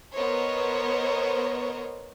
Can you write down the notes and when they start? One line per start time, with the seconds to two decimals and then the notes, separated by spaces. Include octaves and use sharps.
0.13 B3 A#4 C5 C#5 D#5